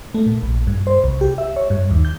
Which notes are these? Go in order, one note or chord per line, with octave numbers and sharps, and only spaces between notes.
A3
A#2
A#1
G2
C5
C2
G4
E5
C#5
G2
D#2
G6